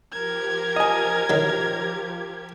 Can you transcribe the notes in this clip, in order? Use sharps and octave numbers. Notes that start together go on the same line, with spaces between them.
F3 G4 A#4 G#6
D#5 G#5
D#3 F#3